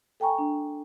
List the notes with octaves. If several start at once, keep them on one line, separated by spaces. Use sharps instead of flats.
A4 G5 G#5 A#5 C#6
D4